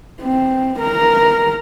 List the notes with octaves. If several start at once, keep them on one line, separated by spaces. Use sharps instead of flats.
C4
A#4 A#5